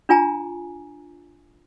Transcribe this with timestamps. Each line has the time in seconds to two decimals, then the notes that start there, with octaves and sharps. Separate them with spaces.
0.09 D4 F4 G#5 A#5